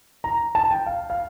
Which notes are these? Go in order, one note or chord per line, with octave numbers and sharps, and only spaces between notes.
A#5
A5
G5
F5
F5